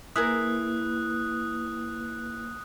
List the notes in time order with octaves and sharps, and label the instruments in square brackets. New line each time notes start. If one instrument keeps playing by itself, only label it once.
[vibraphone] A#3 B4 [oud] E4 G#4 A#4 [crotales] D#6 F#6